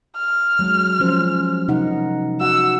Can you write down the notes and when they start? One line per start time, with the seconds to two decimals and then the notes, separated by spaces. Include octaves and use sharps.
0.17 F6
0.59 F#3 G#3
1.00 F3 C#4 C5
1.68 C3 D#4 F#5
2.41 F#4 F#5 E6